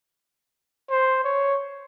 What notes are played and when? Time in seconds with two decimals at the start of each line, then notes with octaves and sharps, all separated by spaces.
0.90 C5
1.24 C#5